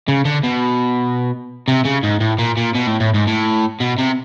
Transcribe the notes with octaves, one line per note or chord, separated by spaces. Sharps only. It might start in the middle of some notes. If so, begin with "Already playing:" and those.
C#3
D3
B2
C3
C#3
G#2
A2
A#2
A#2
B2
A2
A2
G#2
A2
B2
C3